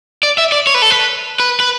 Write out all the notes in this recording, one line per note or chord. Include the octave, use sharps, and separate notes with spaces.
D5
E5
D5
C#5
B4
A4
B4
B4
B4